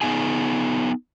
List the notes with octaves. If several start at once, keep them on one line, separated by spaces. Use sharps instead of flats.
B3 D#4 G#4 G#5